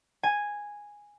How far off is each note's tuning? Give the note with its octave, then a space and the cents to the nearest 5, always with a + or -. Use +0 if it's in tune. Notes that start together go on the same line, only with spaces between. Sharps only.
G#5 -5